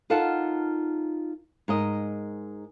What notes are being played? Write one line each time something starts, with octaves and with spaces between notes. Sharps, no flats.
D#4 F4 A4 A#4 F#5 A5
G#2 A#4 D#5